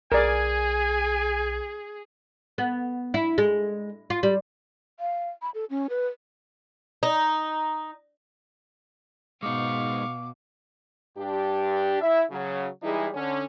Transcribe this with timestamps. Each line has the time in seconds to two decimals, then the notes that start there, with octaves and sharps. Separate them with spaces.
0.12 B1 G#4 A#4 D5 G#5
2.58 B3
3.14 E4
3.38 G#3
4.10 F4
4.23 G3
5.00 F5
5.42 B5
5.54 A4
5.70 C#4
5.90 B4
7.03 D#4
9.43 B2 G#3 D#4 F5 C#6 D6
11.18 G2 D4 G4
12.01 E4 E5
12.31 C#3 F#3
12.83 E3 G3 G#3 D#4 E4 G#4
13.14 D3 C#4